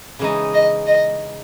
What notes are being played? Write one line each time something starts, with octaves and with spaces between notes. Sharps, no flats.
C#3 E3 G#3 D#4
D#5
D#5